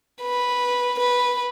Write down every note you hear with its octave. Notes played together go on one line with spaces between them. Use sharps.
B4
B4